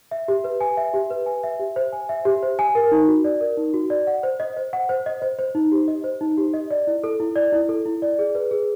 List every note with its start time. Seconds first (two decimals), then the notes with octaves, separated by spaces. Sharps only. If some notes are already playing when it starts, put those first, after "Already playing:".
0.11 E5
0.28 G4
0.44 B4
0.61 G#5
0.77 E5
0.94 G4
1.11 B4
1.26 G#5
1.43 E5
1.59 G4
1.76 C5
1.92 G#5
2.09 E5
2.25 G4
2.43 C5
2.59 G#5
2.75 A#4
2.92 D#4
3.08 F#4
3.24 D5
3.41 A#4
3.57 D#4
3.74 F#4
3.90 D5
4.07 F#5
4.23 C5
4.40 D#5
4.57 C5
4.73 F#5
4.89 C5
5.06 D#5
5.22 C5
5.39 C5
5.55 D#4
5.71 G4
5.88 D#5
6.04 C5
6.21 D#4
6.37 G4
6.54 D#5
6.71 D5
6.87 E4
7.04 A4
7.20 E4
7.36 D5
7.52 E4
7.69 A4
7.86 E4
8.02 D5
8.19 G#4
8.35 B4
8.51 G#4